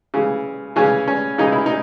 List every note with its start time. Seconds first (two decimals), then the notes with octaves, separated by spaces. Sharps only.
0.14 C#3 E3
0.76 C#3 E3 C#4
1.08 C#4
1.38 C#3 E3 D#4
1.52 E4
1.66 D#4